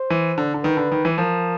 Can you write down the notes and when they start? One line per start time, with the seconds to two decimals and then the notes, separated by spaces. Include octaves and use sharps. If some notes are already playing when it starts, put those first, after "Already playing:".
Already playing: C5
0.10 E3
0.38 D3
0.54 D3
0.63 D#3 B4
0.77 D3
0.92 D#3
1.05 E3
1.18 F3 A#4